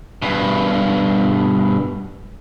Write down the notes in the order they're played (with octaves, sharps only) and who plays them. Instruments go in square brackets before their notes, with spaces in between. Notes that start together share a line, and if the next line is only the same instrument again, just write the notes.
[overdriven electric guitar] G2 B2